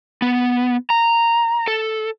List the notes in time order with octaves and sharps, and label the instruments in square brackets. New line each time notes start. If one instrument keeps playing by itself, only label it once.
[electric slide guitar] B3
A#5
A4